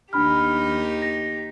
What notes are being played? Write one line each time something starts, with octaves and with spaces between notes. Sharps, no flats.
D#2 D4 D#4 G4 B5 F6
A#6